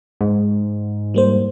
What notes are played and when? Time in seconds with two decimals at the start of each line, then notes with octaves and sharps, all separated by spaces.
0.21 G#2
1.14 G3 A#3 C5